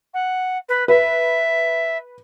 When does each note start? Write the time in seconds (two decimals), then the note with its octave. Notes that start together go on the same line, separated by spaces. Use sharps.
0.14 F#5
0.69 B4
0.88 B4 E5